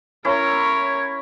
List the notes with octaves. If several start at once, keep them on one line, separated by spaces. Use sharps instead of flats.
C#4 E4 A#4 C#5